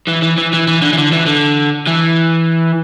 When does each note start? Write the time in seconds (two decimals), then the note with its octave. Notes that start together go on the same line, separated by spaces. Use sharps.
0.08 E3
0.23 E3
0.38 E3
0.53 E3
0.68 E3
0.82 D3
0.93 E3
0.98 D3
1.13 E3
1.27 D3
1.87 E3